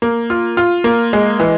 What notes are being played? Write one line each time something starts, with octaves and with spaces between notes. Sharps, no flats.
A#3
F4
F4
A#3
G#3
E3